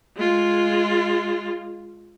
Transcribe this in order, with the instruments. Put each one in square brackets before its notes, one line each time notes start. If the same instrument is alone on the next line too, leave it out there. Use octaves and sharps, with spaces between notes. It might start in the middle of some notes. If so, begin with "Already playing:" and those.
[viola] G#3 F4